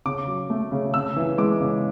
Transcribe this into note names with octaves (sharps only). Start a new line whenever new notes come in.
C#3 D6
F#3
A3
C#3
C#3 E6
E3
G#3 D6
C#3